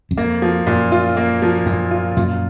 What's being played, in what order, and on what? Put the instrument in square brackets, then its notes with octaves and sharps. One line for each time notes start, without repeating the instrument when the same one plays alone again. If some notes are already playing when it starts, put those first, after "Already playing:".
[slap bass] F#2
[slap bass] F2 [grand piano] A#3
[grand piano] F3
[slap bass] F#2 [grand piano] A#2
[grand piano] F4
A#3
F3
[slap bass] F#2 [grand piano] A#2
[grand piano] F4
[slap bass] F#2 A#2 [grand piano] F4